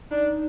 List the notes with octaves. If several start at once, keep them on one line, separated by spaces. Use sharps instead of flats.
D4 D#4